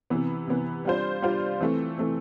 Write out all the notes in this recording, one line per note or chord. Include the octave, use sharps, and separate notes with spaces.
C3 E3 B3
C3 E3 B3
G3 D4 F4 C5
G3 D4 F4 C5
E3 A3 C4
E3 A3 C4